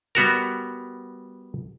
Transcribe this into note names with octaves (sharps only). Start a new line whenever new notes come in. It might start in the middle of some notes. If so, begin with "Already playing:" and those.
G3 B3 F#4 A#4